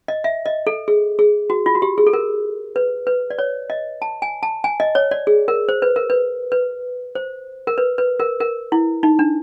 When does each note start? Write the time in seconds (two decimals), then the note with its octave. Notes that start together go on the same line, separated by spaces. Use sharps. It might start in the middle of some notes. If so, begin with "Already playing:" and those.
0.08 D#5
0.24 E5
0.46 D#5
0.67 A4
0.88 G#4
1.19 G#4
1.50 F#4
1.66 F4
1.75 F#4
1.82 G4
1.98 G#4
2.07 A4
2.13 A#4
2.76 B4
3.07 B4
3.30 D5
3.39 C#5
3.70 D#5
4.02 A5
4.22 G#5
4.43 A5
4.64 G#5
4.80 D#5
4.95 C#5
5.11 D5
5.27 G#4
5.48 A#4
5.69 C5
5.82 B4
5.96 A#4
6.10 B4
6.52 B4
7.15 C5
7.67 A#4
7.78 B4
7.98 B4
8.20 A#4
8.40 A#4
8.72 E4
9.03 D#4
9.19 D4